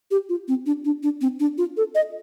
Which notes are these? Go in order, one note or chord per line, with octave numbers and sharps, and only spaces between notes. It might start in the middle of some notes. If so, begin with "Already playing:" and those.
G4
F4
C4
D4
D4
D4
C4
D4
F4
A4
D#5